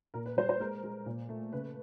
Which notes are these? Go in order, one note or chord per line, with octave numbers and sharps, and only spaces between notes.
A#2 A#4
B4
G3 C5
C5
G#3 A#4
G#3
A#2
A3
C#3 B4